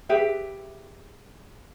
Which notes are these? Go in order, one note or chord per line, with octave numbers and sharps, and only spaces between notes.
G4 G#4 B4 E5